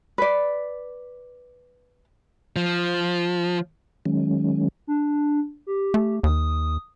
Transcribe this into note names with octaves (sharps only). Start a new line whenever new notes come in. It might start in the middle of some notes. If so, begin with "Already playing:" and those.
B4 D5
F3
D#3 F#3 G#3 C#4
D4
G4
A3
D#2 D#6